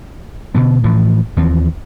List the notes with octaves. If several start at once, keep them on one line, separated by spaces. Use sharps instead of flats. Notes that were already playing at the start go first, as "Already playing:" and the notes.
B2 D3 B3
A2 E3 F3
D#2 E3 F3 C4